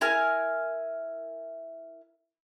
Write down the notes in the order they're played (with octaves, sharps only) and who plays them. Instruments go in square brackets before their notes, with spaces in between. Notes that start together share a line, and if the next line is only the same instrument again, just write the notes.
[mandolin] E4 A#4 G#5 F6